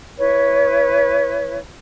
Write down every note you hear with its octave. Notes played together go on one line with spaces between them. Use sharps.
E4 B4 C#5